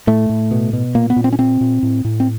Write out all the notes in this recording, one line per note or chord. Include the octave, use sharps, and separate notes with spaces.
A2 A3
A2
B2
B2
A#2 A#3
B3
A#2
C4
C#4
A#2 C4
A#2
A2
A2
C4